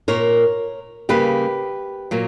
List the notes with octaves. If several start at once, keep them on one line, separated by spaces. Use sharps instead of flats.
A#2 A#3 A#4 C#5
C#3 G3 A#3 G4 B4
A#2 F#3 A#3